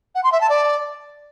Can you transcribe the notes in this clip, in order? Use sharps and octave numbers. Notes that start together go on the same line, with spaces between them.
F#5
C6
E5
A5
D5